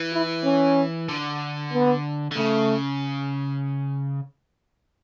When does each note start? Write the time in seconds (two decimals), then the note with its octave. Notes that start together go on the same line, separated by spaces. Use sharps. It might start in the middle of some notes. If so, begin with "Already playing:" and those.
Already playing: E3
0.13 E4
0.44 C#4
1.09 D3
1.73 B3
2.31 D3
2.37 C#3 A3